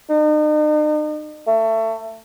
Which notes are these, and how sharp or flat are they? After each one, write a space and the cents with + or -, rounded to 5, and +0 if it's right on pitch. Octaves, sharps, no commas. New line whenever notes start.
D#4 -40
A3 +25